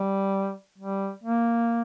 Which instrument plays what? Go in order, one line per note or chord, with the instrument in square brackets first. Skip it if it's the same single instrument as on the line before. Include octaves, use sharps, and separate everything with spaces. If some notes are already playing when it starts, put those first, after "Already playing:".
Already playing: [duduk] G3
G3
A#3